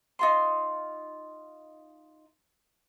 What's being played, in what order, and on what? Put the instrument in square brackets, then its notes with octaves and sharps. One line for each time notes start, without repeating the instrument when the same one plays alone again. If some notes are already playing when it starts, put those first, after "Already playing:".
[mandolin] D#4 F4 C6